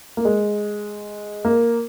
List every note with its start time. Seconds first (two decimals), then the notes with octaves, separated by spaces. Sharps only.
0.17 A#3
0.25 G#3
1.45 A#3